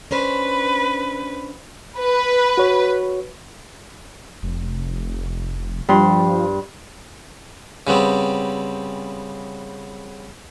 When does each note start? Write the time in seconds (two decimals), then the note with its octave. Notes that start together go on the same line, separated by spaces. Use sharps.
0.11 C#4 D4 B4 C5
1.98 B4
2.58 F#4 C#5
4.43 F1
5.89 G2 F3 C6
7.87 C#3 G3 B3 C4